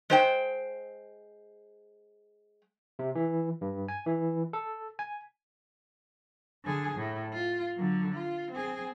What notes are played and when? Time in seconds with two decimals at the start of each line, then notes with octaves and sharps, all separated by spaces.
0.10 G#3 C5 G5
2.99 C3
3.15 E3
3.61 G2
3.88 G#5
4.06 E3
4.53 A4
4.99 G#5
6.64 D3 G#4
6.96 A2
7.33 F4
7.76 D3 F#3
8.13 F4
8.52 C4 G#4